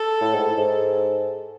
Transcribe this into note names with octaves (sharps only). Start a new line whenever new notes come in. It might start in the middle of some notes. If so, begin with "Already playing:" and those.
Already playing: A4
A2
G#2
G#2